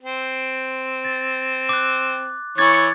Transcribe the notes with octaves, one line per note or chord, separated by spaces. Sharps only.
C4
A6
D6 F#6
E3 C#5 C#6 D6 G#6 A6